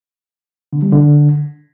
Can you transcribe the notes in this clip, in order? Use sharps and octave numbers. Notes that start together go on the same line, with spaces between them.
D3
G3
D3